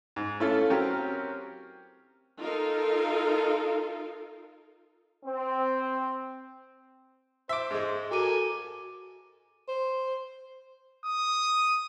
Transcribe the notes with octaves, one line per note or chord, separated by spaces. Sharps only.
G#2
A3 C#4 E4 F4 A4
F#3 C4 C#4 G4 A#4
D#4 F4 A4 A#4 F5
C4
C5 E5 D6
G#2 G#3
F#4 A4 A#4 G#5 D6 D#7
C5
D#6